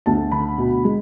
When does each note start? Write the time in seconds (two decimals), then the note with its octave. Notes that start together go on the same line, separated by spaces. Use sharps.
0.06 D2 A5
0.32 D3 B5
0.58 B2
0.84 G#3